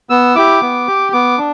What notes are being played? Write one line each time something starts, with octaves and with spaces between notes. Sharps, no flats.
B3 E6
E4 G4 D6
B3
G4
B3 D6
D4